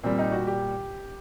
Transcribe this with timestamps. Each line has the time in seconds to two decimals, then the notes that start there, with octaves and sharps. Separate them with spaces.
0.03 A#2 G3 C4
0.19 D#4
0.32 F#4
0.47 G4